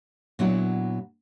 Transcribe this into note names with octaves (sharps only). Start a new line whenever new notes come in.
A#2 F#3 B3 D4 E4 F#4